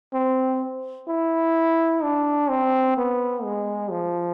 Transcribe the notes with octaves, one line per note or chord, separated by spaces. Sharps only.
C4
E4
D4
C4
B3
G#3
F3